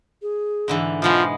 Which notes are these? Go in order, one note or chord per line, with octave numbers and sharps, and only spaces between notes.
G#4
G#2 D3 E3
B2 F3 G#3 B3 F4